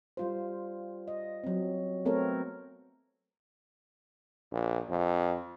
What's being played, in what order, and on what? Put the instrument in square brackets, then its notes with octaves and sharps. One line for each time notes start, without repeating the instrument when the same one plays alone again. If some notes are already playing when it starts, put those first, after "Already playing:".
[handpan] G3 F4 C5
D#5
F#3 C4
A3 B3 C4 A4 A#4 C#5
[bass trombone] A#1
F2